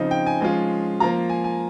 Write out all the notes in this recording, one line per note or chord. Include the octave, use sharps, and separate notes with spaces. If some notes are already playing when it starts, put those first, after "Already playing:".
Already playing: C#3 F3 C4 D#4
G5
G#5
F3 G#3 C#4 F4 G#5
F3 A#3 F4 A#5
G#5
G#5